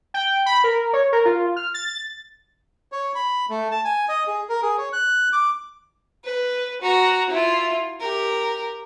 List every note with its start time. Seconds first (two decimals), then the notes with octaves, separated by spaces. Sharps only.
0.14 G5
0.46 B5
0.64 A#4
0.93 C#5
1.12 A#4
1.25 F4
1.56 F6
1.74 A6
2.92 C#5
3.15 B5
3.50 A3
3.71 A5
3.85 G#5
4.09 D#5
4.27 G#4
4.49 A#4
4.63 G#4
4.78 C#5
4.93 F#6
5.33 D6
6.24 B4
6.81 F#4 A#5
7.30 E4 F4
8.00 G4 A#4